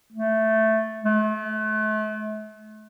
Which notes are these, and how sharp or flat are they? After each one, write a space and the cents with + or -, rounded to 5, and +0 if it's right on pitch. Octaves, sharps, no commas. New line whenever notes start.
A3 +0
A3 -35